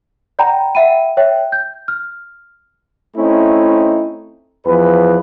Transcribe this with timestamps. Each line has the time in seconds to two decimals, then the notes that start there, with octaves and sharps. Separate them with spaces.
0.39 D5 F#5 G5 A#5 B5
0.75 E5 F#5 G5 B5 D#7
1.17 C#5 E5 G5
1.52 G6
1.88 F6
3.17 A3 C4 C#4 D#4 E4
4.66 E2 F3 B4